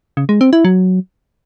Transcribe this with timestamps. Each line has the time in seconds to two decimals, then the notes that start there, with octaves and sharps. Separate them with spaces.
0.17 C#3
0.29 G#3
0.41 C4
0.53 E4
0.65 F#3